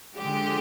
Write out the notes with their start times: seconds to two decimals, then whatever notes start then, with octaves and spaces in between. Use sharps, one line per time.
0.17 D3 F3 G#3 G4